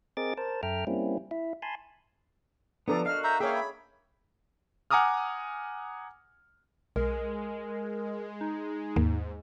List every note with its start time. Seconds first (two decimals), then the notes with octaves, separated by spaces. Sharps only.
0.17 C4 G#4 A#4 D#5 D6 A6
0.38 A#4 C5 A5
0.63 F#2 A4 E5 G5 A#5 F6
0.87 G3 A#3 C4 C#4 E4
1.31 E4 E5
1.62 G#5 A5 B5 C6
2.88 F3 B3 D4 A4 D5 A#5
3.06 F#4 A#4 D#5 F5 F6
3.24 E5 A#5 G6
3.40 A#3 G#4 C#5 E5 F5 G5
3.54 B5
4.91 F#5 G#5 A#5 D6 D#6 F6
6.96 B1 G#3 A#4
8.41 D#4
8.96 D#2 G#2 A#3